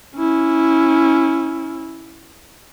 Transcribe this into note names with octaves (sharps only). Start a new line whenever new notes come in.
C#4 E4